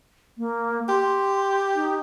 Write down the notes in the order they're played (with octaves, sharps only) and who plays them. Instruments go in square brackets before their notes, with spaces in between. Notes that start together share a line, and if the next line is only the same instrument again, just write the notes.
[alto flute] A#3
[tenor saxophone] G4 [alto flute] C6
[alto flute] D#4